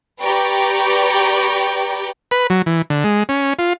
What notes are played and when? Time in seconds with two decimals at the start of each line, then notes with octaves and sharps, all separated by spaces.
0.23 G4 B4 D5 G5 A#5 C#6
2.31 B4
2.50 F#3
2.66 E3
2.90 D3
3.04 G#3
3.29 C#4
3.59 F4